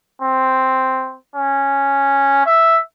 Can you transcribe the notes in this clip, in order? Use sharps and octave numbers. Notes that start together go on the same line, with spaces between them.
C4
C#4
E5